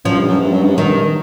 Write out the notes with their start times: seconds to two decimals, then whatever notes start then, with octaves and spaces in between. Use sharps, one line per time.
0.05 F#2 F3
0.17 G2
0.28 F#2
0.39 G2
0.52 F#2
0.64 G2
0.75 F#2 D#3
0.87 G2